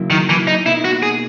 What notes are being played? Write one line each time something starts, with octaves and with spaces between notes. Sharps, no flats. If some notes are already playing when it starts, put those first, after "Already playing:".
Already playing: C#3 F#3 A#3 E4
D#3
E3
D#4
B2 A#3 D#4 E4
F#4
G#4